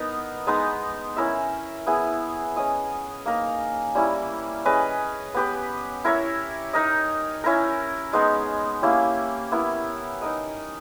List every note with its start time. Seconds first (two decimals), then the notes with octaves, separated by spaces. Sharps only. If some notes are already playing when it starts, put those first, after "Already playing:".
Already playing: B3 D#4 A#4
0.47 G#3 B3 D#4
1.17 C#4 E4 A#4 E5
1.87 B3 E4 G#4
2.56 C#4 G#4 D#5
3.26 A#3 D#4 A#4
3.95 G3 C#4 E4
4.65 C#4 G#4 B4 D#5
5.34 B3 G4 B4
6.05 E4 A#4 C#5 E5
6.73 D#4 A#4 D#5
7.44 C#4 E4 A#4
8.13 G#3 B3 D#4
8.82 A#3 C#4 E4 G4
9.52 B3 E4 A#4
10.22 D#4 A#4 D#5